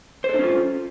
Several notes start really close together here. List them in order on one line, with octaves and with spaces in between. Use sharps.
C5 A4 D#4 C#4 F4